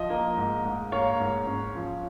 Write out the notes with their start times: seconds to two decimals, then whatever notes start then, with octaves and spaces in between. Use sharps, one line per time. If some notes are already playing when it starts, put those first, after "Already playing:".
Already playing: F3 D#5
0.10 A#3
0.37 G#2
0.65 G#2
0.92 A#3 C#5 F5
1.20 G#2
1.47 C#4
1.75 F3